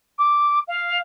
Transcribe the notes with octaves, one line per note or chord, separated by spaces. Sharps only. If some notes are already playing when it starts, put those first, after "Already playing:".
D6
F5